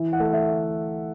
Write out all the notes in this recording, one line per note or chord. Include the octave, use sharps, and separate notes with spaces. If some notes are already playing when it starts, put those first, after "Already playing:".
Already playing: E3
F#5
A3
E5